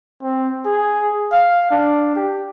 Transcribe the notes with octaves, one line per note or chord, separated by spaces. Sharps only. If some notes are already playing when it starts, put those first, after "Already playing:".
C4
G#4
F5
D4
G4